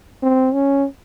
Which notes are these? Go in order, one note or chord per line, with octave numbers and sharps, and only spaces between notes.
C4
C#4